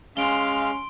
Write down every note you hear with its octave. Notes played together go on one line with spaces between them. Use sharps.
G#3 C#4 F5 C6 D7 G7